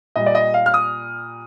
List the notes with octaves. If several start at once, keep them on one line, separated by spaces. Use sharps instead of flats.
A#2 G3 D#5
D5
D#5
F5
F6
D#6